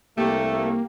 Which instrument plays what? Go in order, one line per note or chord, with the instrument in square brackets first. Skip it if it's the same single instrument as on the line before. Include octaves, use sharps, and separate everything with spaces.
[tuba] C2 [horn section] A3 [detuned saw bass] A#3 [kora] G4